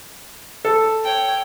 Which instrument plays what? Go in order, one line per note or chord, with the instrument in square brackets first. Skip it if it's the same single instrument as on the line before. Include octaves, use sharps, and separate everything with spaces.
[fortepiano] A4
[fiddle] C#5 G5